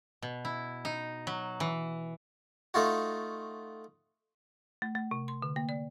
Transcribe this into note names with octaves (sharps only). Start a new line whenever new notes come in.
B2
E4
D#4
F#3
E3
A3 D#4 F4 F#4
A3
A3
C3
C6
D3
A#3
D5